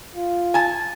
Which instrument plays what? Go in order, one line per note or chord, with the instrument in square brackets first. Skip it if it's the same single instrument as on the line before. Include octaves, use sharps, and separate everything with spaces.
[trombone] F4
[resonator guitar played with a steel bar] G#5 A5